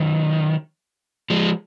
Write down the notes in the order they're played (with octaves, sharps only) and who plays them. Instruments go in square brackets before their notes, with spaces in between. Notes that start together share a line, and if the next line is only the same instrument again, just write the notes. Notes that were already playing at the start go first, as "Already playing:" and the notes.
Already playing: [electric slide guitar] D#3 F#3
F3 G#3